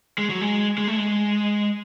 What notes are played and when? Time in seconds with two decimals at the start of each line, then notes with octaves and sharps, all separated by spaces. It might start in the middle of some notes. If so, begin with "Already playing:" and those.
0.18 G#3
0.29 F#3
0.41 G#3
0.78 G#3
0.87 A3
0.97 G#3